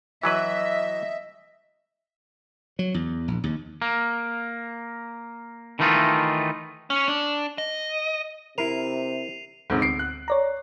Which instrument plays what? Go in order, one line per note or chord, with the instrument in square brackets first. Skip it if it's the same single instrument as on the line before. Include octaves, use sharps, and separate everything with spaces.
[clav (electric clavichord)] E3 F#3 B4 [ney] D#5 [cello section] E5
[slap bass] F#3
E2
A#1
D#2
[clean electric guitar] A#3
D#3 E3 A3 D#4 F4
[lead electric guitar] C#4
D4
D#5
[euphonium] C3 [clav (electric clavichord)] E4 A#4 [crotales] C7 D#7 F7
[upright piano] E1 G#2 [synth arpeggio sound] D#2 C4
[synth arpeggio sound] D2 D7 [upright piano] C7
[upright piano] F#6
[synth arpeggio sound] C#5 D5 A#5